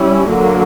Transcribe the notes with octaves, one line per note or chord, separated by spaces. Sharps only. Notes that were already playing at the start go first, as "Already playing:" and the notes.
Already playing: G3 C#4 E4
D3 F#3 A#3